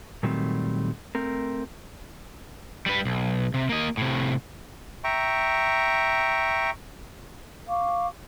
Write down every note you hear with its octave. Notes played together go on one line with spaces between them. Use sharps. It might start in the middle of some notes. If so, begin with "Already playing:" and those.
A#2 D#3 F#3 G3 A3 C4
A3 C4 A#4
G3 B4
B1
C3
A#3 D#5
A2 C3
E5 G5 A#5 C#6
F5 C#6 D6